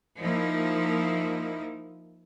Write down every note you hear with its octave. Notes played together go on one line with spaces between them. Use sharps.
F3 A#3 D#4 E4